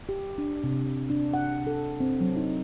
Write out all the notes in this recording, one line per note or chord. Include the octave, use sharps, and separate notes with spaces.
G4
D4
C3
D4
F#5
A4
C4
F#3
D#4